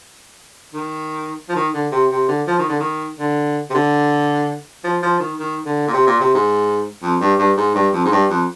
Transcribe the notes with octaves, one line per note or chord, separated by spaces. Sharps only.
D#3
F3
D#3
D3
C3
C3
D3
F3
D#3
D3
D#3
D3
C3
D3
F3
F3
D#3
D#3
D3
A#2
C3
A#2
C3
G#2
F2
G2
G2
G#2
G2
F2
G#2
G2
F2